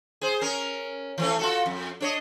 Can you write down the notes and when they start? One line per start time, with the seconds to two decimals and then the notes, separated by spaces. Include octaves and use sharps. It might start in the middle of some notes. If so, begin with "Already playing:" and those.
0.22 G#4 C5
0.41 C#4 A#4
1.18 E3 A3 C#4
1.39 F4 F#4 A4
1.66 F2
2.01 D4 C#5 D#5